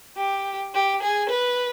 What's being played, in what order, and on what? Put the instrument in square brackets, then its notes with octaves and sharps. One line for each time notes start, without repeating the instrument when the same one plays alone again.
[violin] G4
G4
G#4
B4